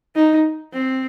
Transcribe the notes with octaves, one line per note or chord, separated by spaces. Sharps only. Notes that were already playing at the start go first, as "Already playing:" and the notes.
D#4
C4